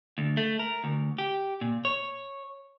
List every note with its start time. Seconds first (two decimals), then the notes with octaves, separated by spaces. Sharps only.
0.18 D2
0.37 A3
0.59 A#4
0.84 D2
1.18 G4
1.61 A#2
1.85 C#5